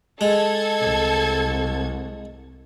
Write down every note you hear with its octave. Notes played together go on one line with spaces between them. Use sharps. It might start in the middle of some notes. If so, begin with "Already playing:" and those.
G#3 A4 G#6
C2